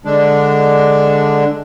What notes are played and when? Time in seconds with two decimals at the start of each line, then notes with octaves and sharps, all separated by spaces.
0.05 D3 G#3 D4